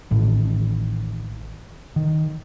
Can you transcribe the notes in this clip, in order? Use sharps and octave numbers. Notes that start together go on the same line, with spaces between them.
A1 A2 D#3
D#3